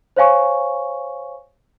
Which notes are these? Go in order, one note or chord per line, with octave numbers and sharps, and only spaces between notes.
C5 C#5 F5 G#5 C#6